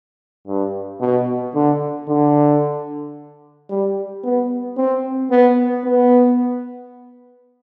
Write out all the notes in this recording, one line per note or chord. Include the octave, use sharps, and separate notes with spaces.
G2
B2
D3
D3
G3
B3
C4
B3
B3